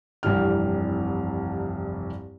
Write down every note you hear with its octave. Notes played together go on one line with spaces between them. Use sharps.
F1 C2 G2 E3 G3 F6